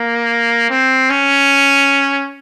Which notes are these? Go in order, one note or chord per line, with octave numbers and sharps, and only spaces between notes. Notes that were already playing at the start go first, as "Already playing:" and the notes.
Already playing: A#3
C4
C#4